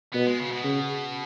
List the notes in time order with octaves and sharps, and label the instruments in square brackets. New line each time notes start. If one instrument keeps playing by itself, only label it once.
[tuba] B2 [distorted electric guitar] B3
[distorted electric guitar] G#3
C#3
B2
[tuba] C#3